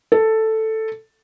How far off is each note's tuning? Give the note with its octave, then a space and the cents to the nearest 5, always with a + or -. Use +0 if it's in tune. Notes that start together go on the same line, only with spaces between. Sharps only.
A4 +5